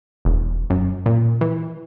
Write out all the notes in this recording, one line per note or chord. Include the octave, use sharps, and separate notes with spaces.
E1
F#2
A#2
E3